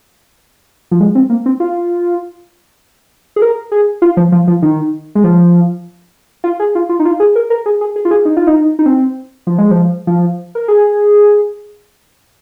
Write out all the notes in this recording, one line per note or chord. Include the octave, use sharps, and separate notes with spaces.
F3
G#3
C4
A#3
C4
F4
G#4
A#4
G#4
F4
F3
F3
F3
D#3
G#3
F3
F4
G#4
F4
F4
D#4
F4
G#4
A#4
A#4
G#4
G#4
G#4
F4
G#4
D#4
F4
D#4
D#4
C4
F3
G#3
F3
F3
A#4
G#4